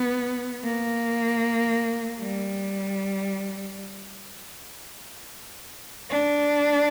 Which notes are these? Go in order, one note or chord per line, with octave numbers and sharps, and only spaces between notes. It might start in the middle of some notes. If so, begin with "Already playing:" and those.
Already playing: B3
A#3
G3
D4